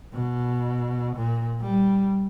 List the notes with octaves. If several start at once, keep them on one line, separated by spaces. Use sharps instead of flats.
B2
A#2
G3